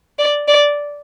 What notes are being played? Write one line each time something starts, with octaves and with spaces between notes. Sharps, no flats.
D5
D5